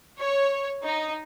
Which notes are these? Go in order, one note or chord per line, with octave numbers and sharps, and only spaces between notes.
C#5
D#4